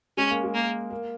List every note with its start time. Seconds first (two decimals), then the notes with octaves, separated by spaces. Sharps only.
0.17 G#3 C#4
0.30 A#3
0.44 G#3
0.54 A#3
0.90 A#3